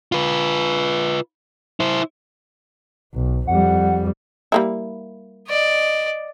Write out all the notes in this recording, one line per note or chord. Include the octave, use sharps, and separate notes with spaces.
F4 B4
E4 C5
B1
F2 G3 F#5
G3 A#3 E4
D5 D#5